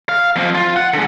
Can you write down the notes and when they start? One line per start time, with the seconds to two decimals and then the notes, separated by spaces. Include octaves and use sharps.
0.09 F5
0.36 F2 F3
0.55 F4
0.76 F#5
0.94 D3 G#3